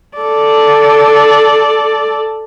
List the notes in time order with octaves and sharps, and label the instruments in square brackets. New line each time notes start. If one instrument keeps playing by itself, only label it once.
[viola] A4 D5